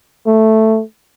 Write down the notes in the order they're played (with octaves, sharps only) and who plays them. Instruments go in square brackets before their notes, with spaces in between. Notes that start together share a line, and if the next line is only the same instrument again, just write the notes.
[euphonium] A3